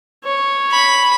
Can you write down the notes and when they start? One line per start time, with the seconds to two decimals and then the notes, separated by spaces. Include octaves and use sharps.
0.24 C#5
0.71 B5